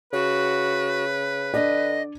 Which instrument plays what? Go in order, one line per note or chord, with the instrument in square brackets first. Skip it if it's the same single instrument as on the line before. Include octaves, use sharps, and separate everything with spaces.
[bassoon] C#3 [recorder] F#4 [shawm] B4
[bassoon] D3 [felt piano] D4 D5 [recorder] D#5